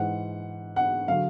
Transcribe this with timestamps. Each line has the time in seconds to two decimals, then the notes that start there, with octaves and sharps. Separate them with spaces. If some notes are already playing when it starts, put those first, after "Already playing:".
Already playing: G#2 E3 F#5
0.76 F#5
1.08 D3 F#3 F5